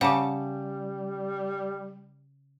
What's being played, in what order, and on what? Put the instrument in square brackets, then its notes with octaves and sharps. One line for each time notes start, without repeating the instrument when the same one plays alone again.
[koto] C#3 [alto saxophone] G3 [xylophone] F#5 A5 D6